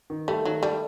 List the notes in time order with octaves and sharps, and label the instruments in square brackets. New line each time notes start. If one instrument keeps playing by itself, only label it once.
[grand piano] D#3
[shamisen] G3 [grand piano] A3
[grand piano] D#3 [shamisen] F#3
[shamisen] G3 [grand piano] A3